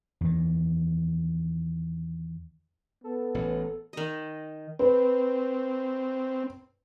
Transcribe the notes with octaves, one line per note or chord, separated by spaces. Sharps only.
E2 D#3
B3 A4
A1 A2
D#3 D#5
C4 B4